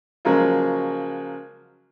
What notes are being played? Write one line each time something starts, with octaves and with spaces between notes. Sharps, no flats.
C#3 F3 F#3 G#3 A#3